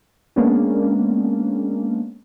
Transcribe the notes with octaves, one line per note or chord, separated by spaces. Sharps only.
G#3 A#3 B3 C#4 D4